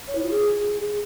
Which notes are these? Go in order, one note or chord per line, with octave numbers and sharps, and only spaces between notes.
C#5
E4
F4
G#4